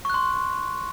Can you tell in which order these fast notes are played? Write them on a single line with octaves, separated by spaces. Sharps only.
C#6 F#6 C6